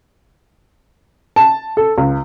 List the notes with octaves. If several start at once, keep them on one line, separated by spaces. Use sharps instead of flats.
A5
A4
C#2